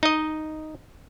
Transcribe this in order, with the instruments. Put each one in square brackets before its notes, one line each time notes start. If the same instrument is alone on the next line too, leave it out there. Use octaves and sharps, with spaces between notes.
[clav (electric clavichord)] D#4 D#5